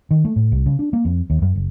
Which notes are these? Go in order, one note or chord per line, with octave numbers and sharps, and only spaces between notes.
D#3
A3
A2
C2
C#3
D4
A#3
F2
D#2
F#2
F#1